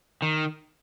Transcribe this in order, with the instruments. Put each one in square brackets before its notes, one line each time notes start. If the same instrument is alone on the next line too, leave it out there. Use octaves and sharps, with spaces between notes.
[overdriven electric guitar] D#3